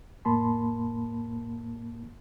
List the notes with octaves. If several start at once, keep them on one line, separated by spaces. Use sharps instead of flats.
F2 A2 A#3 A5 B5 C6